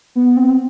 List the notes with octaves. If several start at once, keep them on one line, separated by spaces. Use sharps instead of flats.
B3
C4